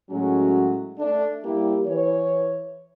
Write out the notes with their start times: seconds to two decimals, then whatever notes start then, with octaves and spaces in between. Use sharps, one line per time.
0.10 A2 F#3 G#3 A3 C#4 F#4
0.99 A3 D4
1.44 G3 A#3 E4 G4
1.86 E3 C#5